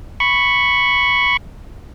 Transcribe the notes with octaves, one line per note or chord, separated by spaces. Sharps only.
B5 C#6